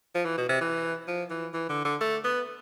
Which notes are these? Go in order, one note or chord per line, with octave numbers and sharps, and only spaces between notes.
F3
E3
B2
C3
E3
F3
E3
E3
D3
D3
A3
B3